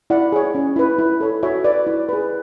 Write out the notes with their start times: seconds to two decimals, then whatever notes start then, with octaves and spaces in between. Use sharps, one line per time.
0.10 E4 D5 F#5
0.32 G#4 C#5
0.55 C#4
0.76 E4 B4
0.98 E4
1.21 A4 C#5
1.43 F#4 C#5 E5
1.64 B4 D5
1.87 E4
2.09 G#4 B4